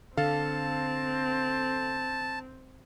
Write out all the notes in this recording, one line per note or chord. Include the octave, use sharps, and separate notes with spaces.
D3 C4 A4 F5 A5